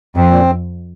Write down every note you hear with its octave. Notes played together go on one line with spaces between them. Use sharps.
F2 C4
A#2